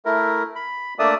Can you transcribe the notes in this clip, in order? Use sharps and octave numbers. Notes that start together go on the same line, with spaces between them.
A3 E4 A#4
B5
A3 A#3 D4 D5 E5 D#6